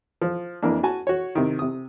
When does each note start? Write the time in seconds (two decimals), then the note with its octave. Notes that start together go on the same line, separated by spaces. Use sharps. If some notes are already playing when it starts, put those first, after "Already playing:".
0.22 F3
0.62 F2 E3 A#3 D4
0.83 F#4 G#5 A5
1.07 F#4 C#5
1.35 C3 D#3
1.59 C3 D#6